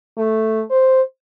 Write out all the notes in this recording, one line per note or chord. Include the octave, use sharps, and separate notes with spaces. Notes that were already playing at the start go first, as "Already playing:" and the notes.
A3
C5